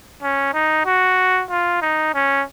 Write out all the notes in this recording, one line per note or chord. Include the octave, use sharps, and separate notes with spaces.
C#4
D#4
F#4
F4
D#4
C#4